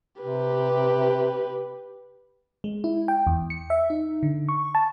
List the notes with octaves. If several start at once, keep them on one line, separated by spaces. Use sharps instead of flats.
C3 G4 B4
G#3
E4
G5
E2
C#7
E5
D#4
D3
C#6
A5